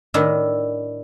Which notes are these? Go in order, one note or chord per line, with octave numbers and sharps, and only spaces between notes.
A2 D#3 D4 E4